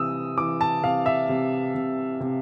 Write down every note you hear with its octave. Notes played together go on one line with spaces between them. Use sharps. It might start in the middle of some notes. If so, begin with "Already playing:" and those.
Already playing: C3 E3 D#6 E6
E3 D6
A5
C3 F5
E5
C3
C3
C3